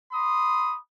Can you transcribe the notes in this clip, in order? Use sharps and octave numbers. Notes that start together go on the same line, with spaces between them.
B5 C6 D#6